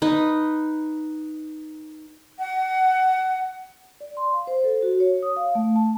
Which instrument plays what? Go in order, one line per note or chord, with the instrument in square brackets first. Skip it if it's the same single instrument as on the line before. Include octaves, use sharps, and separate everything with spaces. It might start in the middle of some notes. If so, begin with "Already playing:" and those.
[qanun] D#4 B4
[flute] F#5
[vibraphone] D5
C6
F5
C5
A4
F#4
C#5
D#6
F5
A3
A5